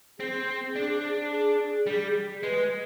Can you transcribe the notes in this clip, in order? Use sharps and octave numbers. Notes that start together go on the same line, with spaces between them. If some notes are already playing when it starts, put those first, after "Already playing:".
C4 G#4
D4
G#4
G3
G#3 B4